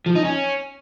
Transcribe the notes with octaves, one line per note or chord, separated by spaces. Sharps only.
F3
D#4
C#4